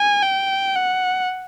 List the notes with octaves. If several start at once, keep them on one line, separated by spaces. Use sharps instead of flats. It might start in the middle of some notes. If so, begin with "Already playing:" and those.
Already playing: G#5
G5
F#5